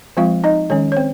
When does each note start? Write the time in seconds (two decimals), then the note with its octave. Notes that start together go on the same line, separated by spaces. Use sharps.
0.17 F3 G#3 C4 F4 F5
0.44 D#4 D#5
0.70 D#3 G#3 C#4 C#5
0.92 C#5
0.97 C4 C5